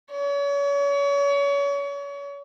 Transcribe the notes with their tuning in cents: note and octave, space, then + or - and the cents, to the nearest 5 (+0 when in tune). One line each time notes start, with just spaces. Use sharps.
C#5 +35